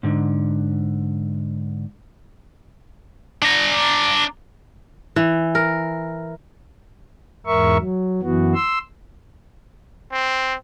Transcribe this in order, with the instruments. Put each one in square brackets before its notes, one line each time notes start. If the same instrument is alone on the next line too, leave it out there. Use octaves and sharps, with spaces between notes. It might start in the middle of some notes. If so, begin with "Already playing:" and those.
[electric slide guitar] G#2 D3
[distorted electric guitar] D4 A#5
[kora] E3
A#4
[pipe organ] E2 G#2 A#4 E5 C#6
F#3
F#2 E3 B3 F#4
C6 E6
[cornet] C4